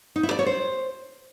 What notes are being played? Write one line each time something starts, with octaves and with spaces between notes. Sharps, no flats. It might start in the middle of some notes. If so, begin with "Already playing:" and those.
D#4
E4
D5
C#5
C5